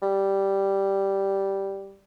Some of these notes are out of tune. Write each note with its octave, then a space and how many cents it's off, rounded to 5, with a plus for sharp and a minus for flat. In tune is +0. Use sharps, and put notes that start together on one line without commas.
G3 -5